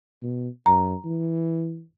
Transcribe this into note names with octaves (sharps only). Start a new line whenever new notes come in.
B2
F#2 A#5
E3